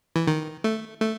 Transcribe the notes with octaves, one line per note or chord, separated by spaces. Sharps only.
E3
D#3
A3
A3